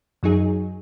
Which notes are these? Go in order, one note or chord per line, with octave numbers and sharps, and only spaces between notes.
F#2 F#3 D#4 G#4